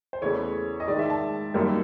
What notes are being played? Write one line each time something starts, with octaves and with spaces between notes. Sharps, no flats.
C5
E2 C#3 E3 A3 C#5
D#5
G#2 D#3 G#3 D5
E5
A5
F#2 D#3 G3 A#3